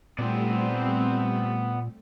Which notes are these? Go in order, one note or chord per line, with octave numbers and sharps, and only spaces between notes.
A#2 G3 A3 B3 C4 D5